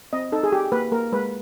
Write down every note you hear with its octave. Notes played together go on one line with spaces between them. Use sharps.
C4 D#5
D#4 A4
G#4
G4
A#3 B4
A#3 A#4
G#3 B4